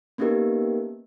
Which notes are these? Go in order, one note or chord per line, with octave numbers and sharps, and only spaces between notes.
A#3 B3 C#4 D#4 G4 A#4